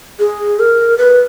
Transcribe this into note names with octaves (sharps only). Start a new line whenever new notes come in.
G#4
A#4
B4